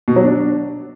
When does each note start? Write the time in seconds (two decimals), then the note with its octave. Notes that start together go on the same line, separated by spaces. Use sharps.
0.08 B2
0.16 F#3
0.25 D4